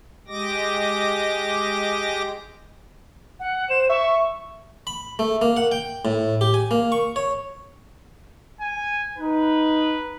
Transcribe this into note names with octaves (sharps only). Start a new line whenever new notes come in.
G#3 G4 D#5 D6 A#6
F#5
C5 E7
E5 C#6
B5
A3
A#3
F#5
G5
A2
G4
G#5
A#3
C#6
C#5
G#5
D#4 B4